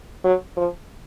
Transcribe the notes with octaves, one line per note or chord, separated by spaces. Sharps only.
F#3
F3